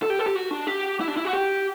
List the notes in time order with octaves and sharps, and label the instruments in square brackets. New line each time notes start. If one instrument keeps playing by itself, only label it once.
[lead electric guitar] A4
G4
A4
G4
F#4
D4
G4
E4
D4
E4
F#4
G4